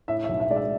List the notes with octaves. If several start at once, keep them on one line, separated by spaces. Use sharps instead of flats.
A2 E5
E5
B1
E5
G#3 D5
E5